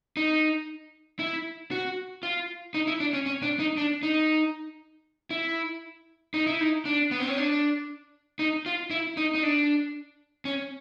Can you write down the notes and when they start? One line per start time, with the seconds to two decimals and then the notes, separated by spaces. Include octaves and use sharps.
0.17 D#4
1.19 E4
1.71 F#4
2.23 F4
2.74 D#4
2.87 E4
3.00 D4
3.13 C#4
3.26 C#4
3.42 D4
3.59 D#4
3.77 D4
4.03 D#4
5.30 E4
6.34 D#4
6.47 E4
6.60 D#4
6.85 D4
7.11 B3
7.20 C4
7.28 C#4
7.37 D4
8.39 D#4
8.66 F4
8.90 E4
9.17 D#4
9.35 D#4
9.43 D4
10.45 C#4